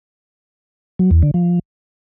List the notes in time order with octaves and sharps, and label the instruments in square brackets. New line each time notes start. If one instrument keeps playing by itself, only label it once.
[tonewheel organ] F#3
E2
D3
F3